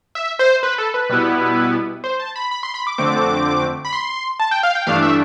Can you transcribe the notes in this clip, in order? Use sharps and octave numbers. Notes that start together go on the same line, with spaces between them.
E5
C5
B4
A4
B4
B2 G3 B3 E4
C5
A5
B5
B5
C6
B5
D6
F2 D3 A3 C4 D6
B5
C6
A5
G5
F5
G5
G2 E3 A3 D4 F5
E5